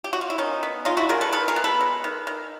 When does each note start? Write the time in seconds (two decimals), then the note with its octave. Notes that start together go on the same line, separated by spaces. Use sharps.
0.04 G4
0.13 F#4
0.21 F4
0.30 E4
0.38 D#3 C#4 D#4
0.63 B3
0.85 G#3 D#4 F4
0.97 E4 F#4
1.09 D#3 G#4 A#4
1.21 A4 B4
1.32 D#3 A4 B4
1.48 G#4 A#4
1.56 B3
1.64 A4 B4
1.80 G#3
2.04 D#3
2.27 D#3